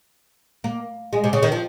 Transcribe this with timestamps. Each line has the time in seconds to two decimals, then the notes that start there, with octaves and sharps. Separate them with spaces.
0.64 A#3
1.13 G#3
1.24 C3
1.33 C#3
1.43 D#3
1.52 F3